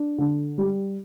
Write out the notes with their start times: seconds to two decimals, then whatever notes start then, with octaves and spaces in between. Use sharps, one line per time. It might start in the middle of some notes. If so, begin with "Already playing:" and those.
Already playing: D4
0.18 D3
0.58 G3